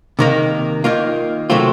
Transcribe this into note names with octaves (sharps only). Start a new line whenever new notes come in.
C3 D#3 A#3
D#3 A#3 F4
C3 F#3 A3 C4 F4